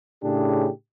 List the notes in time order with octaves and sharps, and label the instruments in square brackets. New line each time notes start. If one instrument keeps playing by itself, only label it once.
[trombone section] A2 C#3 D4 G4 G#4